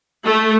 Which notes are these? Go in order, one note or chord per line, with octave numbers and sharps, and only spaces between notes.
A3